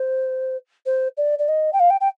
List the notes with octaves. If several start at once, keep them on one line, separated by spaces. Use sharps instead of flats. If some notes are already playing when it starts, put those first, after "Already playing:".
Already playing: C5
C5
D5
D5
D#5
G5
F5
G5
G5